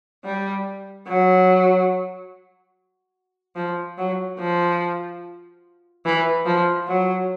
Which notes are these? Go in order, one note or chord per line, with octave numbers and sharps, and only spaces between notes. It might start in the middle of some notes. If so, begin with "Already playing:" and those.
G3
F#3
F3
F#3
F3
E3
F3
F#3